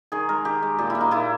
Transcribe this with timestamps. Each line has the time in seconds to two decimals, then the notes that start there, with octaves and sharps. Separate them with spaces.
0.12 D#3 G#4
0.29 G#3 A#4
0.45 D#3 G4
0.63 G#3
0.79 A#2 G4
0.90 E4
0.95 A#3
1.01 D#4
1.11 A#2 E4